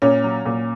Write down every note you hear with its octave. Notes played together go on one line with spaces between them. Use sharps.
A#2 C#4
F#3
A#2